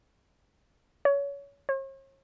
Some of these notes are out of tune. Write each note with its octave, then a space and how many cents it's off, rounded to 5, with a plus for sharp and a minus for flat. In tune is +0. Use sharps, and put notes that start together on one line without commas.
C#5 +25
C#5 -45